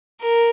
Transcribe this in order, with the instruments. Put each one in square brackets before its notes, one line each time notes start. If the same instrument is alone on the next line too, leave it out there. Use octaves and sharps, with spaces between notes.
[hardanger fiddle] A#4